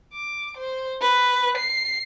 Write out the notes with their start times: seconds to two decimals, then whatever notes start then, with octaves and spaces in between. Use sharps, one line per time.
0.14 D6
0.57 C5
1.01 B4
1.57 C7